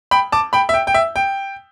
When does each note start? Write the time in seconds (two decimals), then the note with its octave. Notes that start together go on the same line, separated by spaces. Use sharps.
0.11 G5 B5
0.32 A5 D6
0.53 G5 B5
0.69 E5
0.74 G5
0.87 G5
0.94 E5
1.16 G5